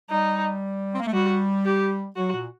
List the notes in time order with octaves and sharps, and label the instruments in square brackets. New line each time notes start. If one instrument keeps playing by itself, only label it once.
[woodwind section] G3 [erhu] D#4
[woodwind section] C4
A#3
A3
[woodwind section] G3 [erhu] F#4
[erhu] G4
[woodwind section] F#3 [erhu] F#4
[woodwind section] A#2